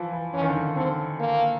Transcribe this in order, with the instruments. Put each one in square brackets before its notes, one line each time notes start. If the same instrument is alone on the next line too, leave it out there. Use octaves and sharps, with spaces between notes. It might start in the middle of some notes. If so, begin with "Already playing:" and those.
Already playing: [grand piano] E3 F3
E3
[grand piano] E3 [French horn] C#4
[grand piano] D#3
D3
D#3
[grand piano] D3 [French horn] C4
[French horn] A#3